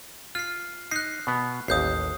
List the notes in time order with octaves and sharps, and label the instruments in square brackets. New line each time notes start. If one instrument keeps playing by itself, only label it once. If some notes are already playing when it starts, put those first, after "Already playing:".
[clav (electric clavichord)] F4 [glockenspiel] F6 C7
[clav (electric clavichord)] D#4 [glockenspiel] F#6 C7
[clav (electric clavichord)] B2 B3
[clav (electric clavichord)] A1 D#2 [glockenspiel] D#6 G6 C7